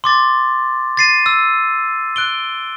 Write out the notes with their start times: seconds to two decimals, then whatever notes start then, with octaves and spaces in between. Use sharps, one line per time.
0.04 C6 D6 A6
0.97 A6 C7 D#7
1.26 E6
2.16 F#6 D7 G7